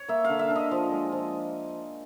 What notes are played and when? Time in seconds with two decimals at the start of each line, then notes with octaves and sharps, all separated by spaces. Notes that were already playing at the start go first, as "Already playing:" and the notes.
Already playing: C#5
0.09 A#3 E5
0.25 D3 F5
0.39 E5
0.50 D3
0.56 D#5
0.71 F3
0.92 G#3
1.12 F3